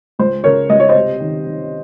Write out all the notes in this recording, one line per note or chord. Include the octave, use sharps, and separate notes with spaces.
C#2 C5
C#3 A#4 C#5
C#2 D#5
C#5
C5 D#5
C3
D#3
D#3